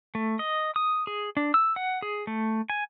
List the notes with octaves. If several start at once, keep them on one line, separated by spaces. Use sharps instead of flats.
A3
D#5
D#6
G#4
D4
E6
F#5
G#4
A3
G#5